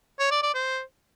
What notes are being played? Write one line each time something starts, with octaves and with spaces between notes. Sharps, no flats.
C#5
D5
D5
C5